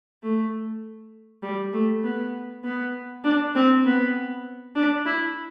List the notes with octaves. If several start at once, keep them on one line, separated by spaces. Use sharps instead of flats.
A3
G3
A3
B3
B3
D4
C4
B3
D4
E4